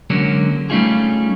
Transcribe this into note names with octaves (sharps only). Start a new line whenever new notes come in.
D3 F#3 G#3 A#3 C#4
G3 A3 C#4 D#4 F4 G#4